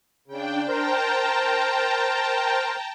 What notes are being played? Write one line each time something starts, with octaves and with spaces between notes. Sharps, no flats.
C#3 D4 G5
A#4 C5 G5 A5 A#5